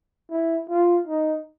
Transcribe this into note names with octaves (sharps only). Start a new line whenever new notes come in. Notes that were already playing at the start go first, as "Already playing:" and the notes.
E4
F4
D#4